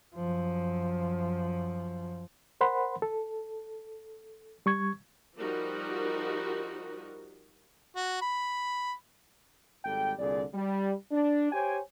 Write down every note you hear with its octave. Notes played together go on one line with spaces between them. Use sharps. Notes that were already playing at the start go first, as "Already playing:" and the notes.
F#2 F3
A#4 C5 F#5 B5 C6
A4
G3 C#6 G#6
F3 G3 D#4 F#4 A#4
F#4
B5
G#1 G3 A4 G5
C2 A#2 D3 G#4 D5
G3
D4
G4 C5 C#5 G5 G#5